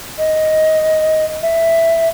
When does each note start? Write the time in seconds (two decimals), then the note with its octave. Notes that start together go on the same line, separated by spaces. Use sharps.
0.18 D#5
1.42 E5